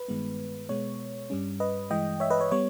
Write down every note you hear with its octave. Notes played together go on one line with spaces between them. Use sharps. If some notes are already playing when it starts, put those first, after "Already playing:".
Already playing: B4
G2 D#3 G#3 B3
B2 G#3 B3 C#5
G2 G3 C#4
B4 D#5
G2 E3 G#3 D#5 G5
C#5 E5
B4 D#5
C#5
G3 B3 C#5